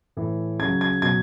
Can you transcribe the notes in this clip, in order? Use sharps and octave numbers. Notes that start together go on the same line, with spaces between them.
A2 E3
C#3 F#3 G#6
G#6
B2 F#3 G#6